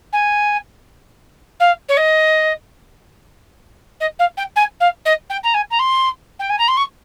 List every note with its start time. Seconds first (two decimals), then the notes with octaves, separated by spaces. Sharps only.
0.13 G#5
1.60 F5
1.89 C#5
1.97 D#5
4.00 D#5
4.19 F5
4.37 G5
4.56 G#5
4.80 F5
5.05 D#5
5.30 G5
5.44 A#5
5.54 G#5
5.71 A#5
5.79 C6
6.39 G5
6.50 G#5
6.59 A#5
6.68 C6
6.77 C#6